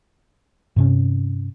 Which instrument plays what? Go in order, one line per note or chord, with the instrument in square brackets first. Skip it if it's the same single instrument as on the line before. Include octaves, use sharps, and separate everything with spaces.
[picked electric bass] G2 C3 C#4